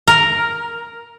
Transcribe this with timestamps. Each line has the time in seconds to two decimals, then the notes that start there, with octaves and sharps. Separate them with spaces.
0.08 A#4